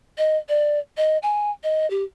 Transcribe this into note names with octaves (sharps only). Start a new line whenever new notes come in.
D#5
D5
D#5
G#5
D#5
G4